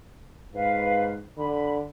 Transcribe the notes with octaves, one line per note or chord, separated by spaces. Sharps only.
G#2 B4 F5
D3 B5